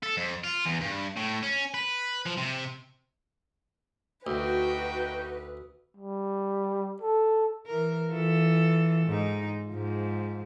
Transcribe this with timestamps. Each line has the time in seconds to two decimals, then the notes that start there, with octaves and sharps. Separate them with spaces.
0.03 A4
0.17 F2
0.44 F4
0.66 E2
0.81 G2
1.17 A2
1.43 C#4
1.74 B4
2.26 F3
2.38 C3
4.27 D2 D#4 F#4 B4 G5
5.97 G3
7.02 A4
7.66 E3 A#4
8.11 E3 F4 A4
9.07 G#2 D#4
9.69 G#2 F3